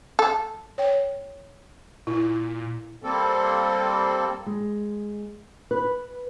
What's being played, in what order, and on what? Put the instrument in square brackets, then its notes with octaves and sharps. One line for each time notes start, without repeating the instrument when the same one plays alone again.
[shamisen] A4
[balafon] C#5 G5
[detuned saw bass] A#2 [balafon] E4
[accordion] G3 A#3 C4 A4
[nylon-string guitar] G#3
B4